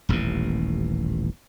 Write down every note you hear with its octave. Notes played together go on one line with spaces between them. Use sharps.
D#1 A1 D#2 B2